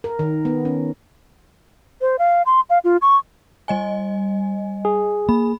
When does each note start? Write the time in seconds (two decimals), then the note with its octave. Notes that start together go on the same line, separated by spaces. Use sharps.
0.04 A#4
0.19 D#3
0.45 B3
0.65 C#4
2.01 C5
2.19 F5
2.46 C6
2.70 F5
2.84 F4
3.02 C#6
3.68 G3 D#5 G#5
4.85 G#4
5.29 A#3 B5